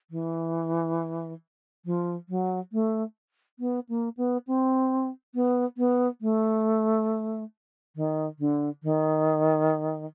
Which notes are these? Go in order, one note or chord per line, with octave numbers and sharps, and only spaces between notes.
E3
F3
F#3
A3
B3
A#3
B3
C4
B3
B3
A3
D#3
D3
D#3